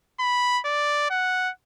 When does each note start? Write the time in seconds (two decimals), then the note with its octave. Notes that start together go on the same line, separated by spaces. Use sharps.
0.20 B5
0.65 D5
1.10 F#5